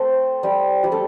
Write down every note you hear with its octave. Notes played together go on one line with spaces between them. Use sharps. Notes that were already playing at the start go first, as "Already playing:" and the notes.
Already playing: A3 C4 A4 C5
G3 G4
G3 G4
A3 A4